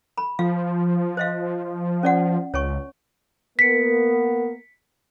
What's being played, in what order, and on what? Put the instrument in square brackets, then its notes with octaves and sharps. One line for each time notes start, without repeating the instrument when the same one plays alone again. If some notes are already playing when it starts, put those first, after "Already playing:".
[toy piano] B5
[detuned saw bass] F3 [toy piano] F5
[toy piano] C5 D#5 F5
C#4 D5 F#5
[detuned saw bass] C#2 [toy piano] C#5 G#5 C#6
[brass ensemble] A#3 B3 A#4 [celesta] B6 C#7